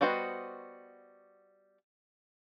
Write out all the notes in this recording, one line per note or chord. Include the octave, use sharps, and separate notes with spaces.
G3 B3 F#4 C5 D#5